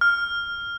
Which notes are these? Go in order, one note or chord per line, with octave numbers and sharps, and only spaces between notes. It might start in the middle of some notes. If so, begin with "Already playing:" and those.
F6